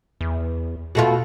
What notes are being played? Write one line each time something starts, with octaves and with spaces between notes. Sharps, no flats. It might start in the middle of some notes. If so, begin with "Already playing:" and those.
E2
B2 A3 F4 F#4